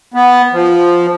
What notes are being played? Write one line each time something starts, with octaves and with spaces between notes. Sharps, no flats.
B3
F3